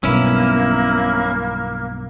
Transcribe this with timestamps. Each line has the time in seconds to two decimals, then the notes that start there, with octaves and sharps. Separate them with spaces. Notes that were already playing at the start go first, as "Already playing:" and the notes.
0.04 B1 G2 B2 A#3 B3 C#4 E4